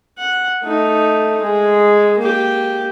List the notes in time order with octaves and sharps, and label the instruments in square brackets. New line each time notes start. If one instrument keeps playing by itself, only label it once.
[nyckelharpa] F#5
A3 D#4
G#3
A#3 G4